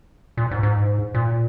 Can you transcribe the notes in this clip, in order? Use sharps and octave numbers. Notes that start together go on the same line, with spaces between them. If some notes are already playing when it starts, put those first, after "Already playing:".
A#2
G#2
G#2
A#2